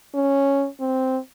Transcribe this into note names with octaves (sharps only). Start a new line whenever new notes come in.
C#4
C4